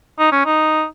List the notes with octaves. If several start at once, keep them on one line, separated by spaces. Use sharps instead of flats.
D#4
C#4
D#4